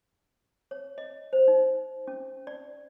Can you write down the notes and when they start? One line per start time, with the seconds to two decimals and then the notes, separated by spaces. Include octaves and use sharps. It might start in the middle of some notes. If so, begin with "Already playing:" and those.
0.71 C#5
0.98 D#5
1.33 C5
1.48 D#4
2.07 C#4
2.47 D5